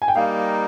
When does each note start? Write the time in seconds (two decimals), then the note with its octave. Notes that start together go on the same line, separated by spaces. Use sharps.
0.02 G#5
0.08 G5
0.15 G3 A#3 D#4 F5